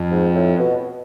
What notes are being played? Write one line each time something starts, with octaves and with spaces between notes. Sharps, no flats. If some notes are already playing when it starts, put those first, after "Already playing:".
Already playing: F2
G#2
A2
B2